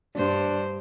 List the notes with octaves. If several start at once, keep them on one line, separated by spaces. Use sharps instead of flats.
G2 D4 C5